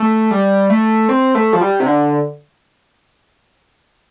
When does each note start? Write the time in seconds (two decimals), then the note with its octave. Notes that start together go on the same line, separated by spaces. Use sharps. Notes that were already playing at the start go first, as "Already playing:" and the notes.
Already playing: A3
0.31 G3
0.70 A3
1.09 C4
1.35 A3
1.53 F3
1.61 G3
1.80 C3
1.86 D3